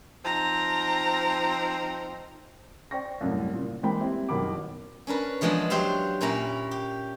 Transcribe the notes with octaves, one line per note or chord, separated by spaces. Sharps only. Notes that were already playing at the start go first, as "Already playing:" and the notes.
F3 C4 D#4 A#5
C5 D5 G5 C#6 A#6
C2 F#2 A2
A#2 C#3
E3 G#3 A#3 C5 G5 B5
G3 C4 E4
F#1 B2 D#3 B5 D6
C#4 D4 A#4 B4
E3 F3 G#3 B3 D4
F#3 G4 C5 E5 F5
A#2 C#4 E4 A#5
G4